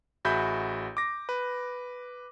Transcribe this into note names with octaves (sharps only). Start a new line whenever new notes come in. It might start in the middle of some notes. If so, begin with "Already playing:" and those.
A1 F#4 G#4 E5 B5 G6
D6 A#6
B4